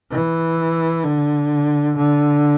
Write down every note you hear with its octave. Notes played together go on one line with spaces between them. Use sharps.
E3
D3
D3